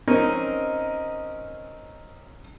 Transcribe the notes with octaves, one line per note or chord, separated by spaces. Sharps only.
C4 C#4 D#4 A#4 D#5